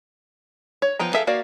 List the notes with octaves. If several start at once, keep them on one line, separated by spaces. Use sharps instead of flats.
C#5
F3 B3 G5 A#5
G#4 A4 E5 F5 G5
A#3 F#4 D5 F5